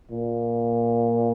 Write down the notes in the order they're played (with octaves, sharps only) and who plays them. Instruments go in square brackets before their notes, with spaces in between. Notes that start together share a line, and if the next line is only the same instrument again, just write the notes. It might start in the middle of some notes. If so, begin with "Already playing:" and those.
[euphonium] A#2